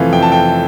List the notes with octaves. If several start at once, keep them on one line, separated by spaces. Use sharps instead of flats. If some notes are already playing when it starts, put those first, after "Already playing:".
Already playing: F2 C3 E3 A3 F5
F2 G5
A5
G5